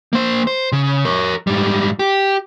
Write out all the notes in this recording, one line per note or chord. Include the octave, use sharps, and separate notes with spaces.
A#3 C5
C5
C#3
A#4 C#5
G#2 G3
G4